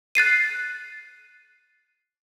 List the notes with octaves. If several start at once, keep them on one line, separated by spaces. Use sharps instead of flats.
F#6 A6 C7 D#7